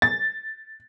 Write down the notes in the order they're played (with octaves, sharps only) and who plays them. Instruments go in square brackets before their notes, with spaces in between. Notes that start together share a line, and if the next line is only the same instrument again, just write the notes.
[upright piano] A6